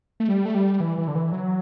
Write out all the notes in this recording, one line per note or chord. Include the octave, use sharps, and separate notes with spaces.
A3
G3
A3
G3
E3
E3
D3
E3
F#3